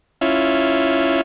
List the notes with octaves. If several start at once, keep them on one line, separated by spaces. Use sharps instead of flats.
C#4 E4 F4